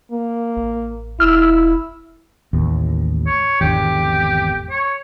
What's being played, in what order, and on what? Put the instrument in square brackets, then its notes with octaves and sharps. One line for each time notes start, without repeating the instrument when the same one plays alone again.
[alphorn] A#3
[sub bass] A1
[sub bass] E1 [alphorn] E4 [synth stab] E6 F6
[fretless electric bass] A1 D#2
[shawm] C#5
[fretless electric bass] G#1 E2 D3 [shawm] G4
[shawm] C#5